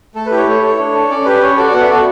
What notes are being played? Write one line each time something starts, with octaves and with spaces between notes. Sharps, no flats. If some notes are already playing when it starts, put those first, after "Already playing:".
A3 A4
B4
E4 G4
C#5
A3 C#5
E4 A4
D4
A4
C#4 D5
G4 B4
C#4 C#5
F#4 A4 D5
B3 F#5
E5
F#4 A4 D5